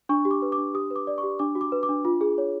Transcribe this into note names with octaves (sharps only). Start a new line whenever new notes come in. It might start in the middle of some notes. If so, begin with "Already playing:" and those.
D4 C#6
G4
D6
B4
D6
D4
G4 D#6
B4
D6
D5
C#6
G4
D4 D6
F#4
D6
B4
D6
D4
F4
G#4
C#5